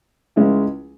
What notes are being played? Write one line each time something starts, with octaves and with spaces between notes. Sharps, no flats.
C#2 C#3 G#3 C#4 E4